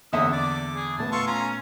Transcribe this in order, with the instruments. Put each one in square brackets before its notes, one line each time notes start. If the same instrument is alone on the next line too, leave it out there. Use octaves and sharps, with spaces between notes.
[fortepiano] E2 D3 E5 [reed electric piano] A#3 [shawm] D#6
[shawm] D5 [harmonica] D6
[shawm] G#4
[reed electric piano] A#2 A3 B3 [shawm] A5
[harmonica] F4 C6 C#6 [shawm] A4
[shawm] C#4 [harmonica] F4 G#5 A#5